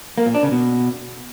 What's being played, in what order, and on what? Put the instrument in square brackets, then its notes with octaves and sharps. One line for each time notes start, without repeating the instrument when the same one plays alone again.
[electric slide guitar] A#3
A#2
D4
C#3
B2